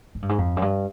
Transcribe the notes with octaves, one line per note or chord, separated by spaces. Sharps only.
G#2
G2
G#2
F2
F#2
G2